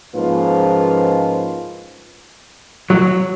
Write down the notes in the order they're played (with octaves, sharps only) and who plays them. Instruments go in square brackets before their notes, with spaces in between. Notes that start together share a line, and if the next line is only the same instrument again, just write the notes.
[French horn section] G#2 F3 A#3 C#4 F4 B4
[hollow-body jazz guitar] F#3